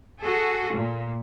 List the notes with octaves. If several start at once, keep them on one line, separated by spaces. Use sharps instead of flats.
F#4 G#4 A4
A#2